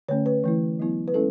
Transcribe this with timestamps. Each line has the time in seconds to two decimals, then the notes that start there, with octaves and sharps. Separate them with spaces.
0.08 D3 A3 C#4 C#5
0.26 B4
0.44 E3 A3 E4
0.79 F#3 B3 E4
1.08 B4
1.14 G#3 C#4 E4 A4